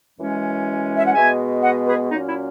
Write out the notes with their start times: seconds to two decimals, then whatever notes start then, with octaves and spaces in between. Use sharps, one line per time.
0.19 F#2 E3 G#3 C#4
0.97 E5
1.06 F#5
1.15 B2 G#3 B3 E5 G#5
1.62 D#5 F#5
1.86 G#4 B4
2.10 A#2 F#3 C#4 D#4
2.27 E4